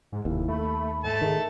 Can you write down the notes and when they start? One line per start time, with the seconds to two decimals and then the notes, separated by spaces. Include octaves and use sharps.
0.12 G#2
0.25 F1 D#2 E4
0.48 A3 B5
1.04 G#2 A3 A5
1.21 D#3 G#4